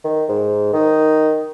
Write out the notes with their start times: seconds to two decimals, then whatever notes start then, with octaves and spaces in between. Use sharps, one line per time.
0.04 D#3
0.29 G#2
0.73 D#3 D#4